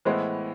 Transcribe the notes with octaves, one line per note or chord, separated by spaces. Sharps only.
A2 E3 G#3 B3 E4 C5